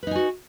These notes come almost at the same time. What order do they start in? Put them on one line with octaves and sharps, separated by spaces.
B4 D#4 G#5 F#4